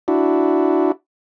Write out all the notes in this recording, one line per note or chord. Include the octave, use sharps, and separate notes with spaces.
D4 E4 F#4